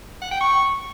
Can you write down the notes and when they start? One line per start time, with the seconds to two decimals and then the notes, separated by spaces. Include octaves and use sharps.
0.22 F#5
0.31 G5
0.41 C#6